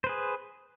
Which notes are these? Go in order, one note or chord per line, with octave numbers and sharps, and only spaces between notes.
G#4 B4 C5